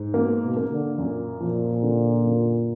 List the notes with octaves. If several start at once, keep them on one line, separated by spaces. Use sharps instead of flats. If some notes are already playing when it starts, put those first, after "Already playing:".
Already playing: G#2
B2 A#3
B2
A#3
D3
F#2 A#2
A#2 F3
D3
F#2